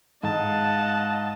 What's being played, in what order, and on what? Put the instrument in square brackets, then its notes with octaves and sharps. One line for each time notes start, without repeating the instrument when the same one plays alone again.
[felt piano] G#2 [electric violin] D#5 A5 [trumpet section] F5 F#5